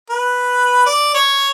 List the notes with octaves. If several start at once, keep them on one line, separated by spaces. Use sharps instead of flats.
B4
D5
C#5